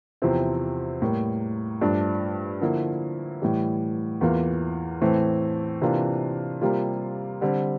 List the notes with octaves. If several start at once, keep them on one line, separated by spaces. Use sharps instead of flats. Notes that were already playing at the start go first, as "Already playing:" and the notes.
E2 C3 F3 C4 E4
A2 G3 A#3
G2 F3 A3 D4
D3 F3 A#3 E4
A2 E3 G3
E2 E3 A#3 F4
A2 E3 A3 C4
C3 E3 A#3 D4 F4
C3 G3 A#3 F4
D3 G3 C4